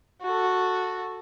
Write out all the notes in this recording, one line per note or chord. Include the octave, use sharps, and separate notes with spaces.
F#4 A4